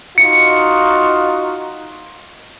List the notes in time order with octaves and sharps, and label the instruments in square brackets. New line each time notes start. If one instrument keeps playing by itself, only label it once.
[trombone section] D#4 F4 F#4 [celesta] C#7